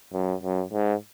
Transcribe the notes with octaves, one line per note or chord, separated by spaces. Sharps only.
F#2
F#2
G#2